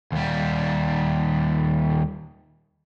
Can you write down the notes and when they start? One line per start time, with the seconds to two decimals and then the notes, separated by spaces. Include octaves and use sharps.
0.12 D#2 G3